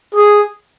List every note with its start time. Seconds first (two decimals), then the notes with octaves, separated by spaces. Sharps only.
0.14 G#4